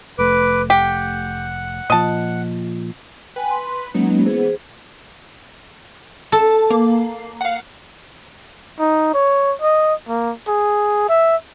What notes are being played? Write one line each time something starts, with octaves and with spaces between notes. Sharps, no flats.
F1 A3 B4 D6
G4 F#5
A#2 F3 D#5 A5
B4 G5 G#5
C6
F#3 G#3 A#3 B3 C#4 D#4
E3 B3 G#4 C5
A4 A5
A#3
F5 F#5
D#4
C#5
D#5
A#3
G#4
E5